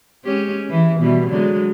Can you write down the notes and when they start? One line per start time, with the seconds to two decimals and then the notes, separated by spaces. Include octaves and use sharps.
0.25 G#3 C#4 G4
0.70 E3
1.00 B2 E3 G3
1.30 D3 F#3 G#3